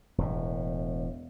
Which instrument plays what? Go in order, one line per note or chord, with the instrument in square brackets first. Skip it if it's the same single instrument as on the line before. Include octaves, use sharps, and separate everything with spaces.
[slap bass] E1 A2